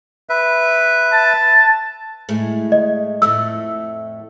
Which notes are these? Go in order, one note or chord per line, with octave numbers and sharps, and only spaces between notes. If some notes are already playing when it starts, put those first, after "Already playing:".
B4 E5
A5
A2 G#3 A3
D#5
F2 A2 A3 E6